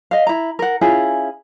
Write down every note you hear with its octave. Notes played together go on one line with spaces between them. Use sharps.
D#5 F5
E4 A#5
A#4 F#5
C#4 E4 F4 G#4